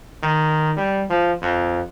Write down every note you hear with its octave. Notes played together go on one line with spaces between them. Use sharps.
D#3
G3
F3
F2